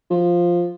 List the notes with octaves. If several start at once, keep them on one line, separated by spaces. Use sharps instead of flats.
F3